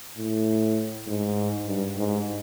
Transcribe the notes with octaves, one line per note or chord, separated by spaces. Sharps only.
A2
G#2
G2
G#2